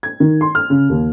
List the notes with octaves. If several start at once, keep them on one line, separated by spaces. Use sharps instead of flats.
G#6
D#3
C6
F6
C#3
D#2